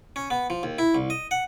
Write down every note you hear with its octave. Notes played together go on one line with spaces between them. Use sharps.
C#4
B3
F3
D#2
E4
C2
D#5
F#5